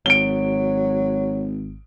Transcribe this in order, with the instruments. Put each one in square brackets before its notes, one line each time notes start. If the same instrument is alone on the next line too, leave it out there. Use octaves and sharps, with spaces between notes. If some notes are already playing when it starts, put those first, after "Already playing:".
[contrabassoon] G#1 [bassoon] F#3 [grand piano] D7 G7